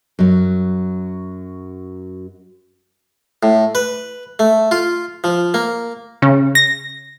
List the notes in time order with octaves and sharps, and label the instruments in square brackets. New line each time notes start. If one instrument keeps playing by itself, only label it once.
[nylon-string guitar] F#2 F#3
[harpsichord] A2
B4
A3
F4
F3
A#3
[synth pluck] C#3
A#6